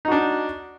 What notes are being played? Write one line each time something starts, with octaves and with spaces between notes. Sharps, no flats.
D4 D#4 F#4